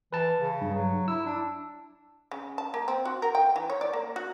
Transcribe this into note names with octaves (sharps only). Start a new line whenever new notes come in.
E3 B4 A5
C#3
G2
F#3
E4 E6
D4
C#3
A5
A#3
C4
F#4
A#4
G5
E3
C#5
D5
A#3
F#4